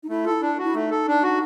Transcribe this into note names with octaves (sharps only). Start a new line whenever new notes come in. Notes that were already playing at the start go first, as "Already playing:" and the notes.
D#4
A3 E4
F4 A4
E4
D4
F#4
E4
A3 D#4
A4
D4
F#4